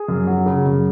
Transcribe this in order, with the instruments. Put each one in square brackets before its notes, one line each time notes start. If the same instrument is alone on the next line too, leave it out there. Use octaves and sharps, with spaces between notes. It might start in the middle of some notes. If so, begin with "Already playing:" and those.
Already playing: [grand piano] G#4
F#2
F#3
C#3
F#2